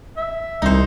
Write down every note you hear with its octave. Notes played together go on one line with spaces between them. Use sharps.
E5
C2 D#4 C5